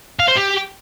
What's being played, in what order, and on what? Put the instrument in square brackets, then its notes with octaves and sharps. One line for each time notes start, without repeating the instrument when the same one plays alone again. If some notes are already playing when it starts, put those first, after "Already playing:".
[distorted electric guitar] F5
C5
G4